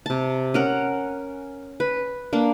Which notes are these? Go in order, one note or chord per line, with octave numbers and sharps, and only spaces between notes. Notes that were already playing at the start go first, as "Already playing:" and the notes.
C3 A5
C#4 A#4 F#5
B4
A#3 D4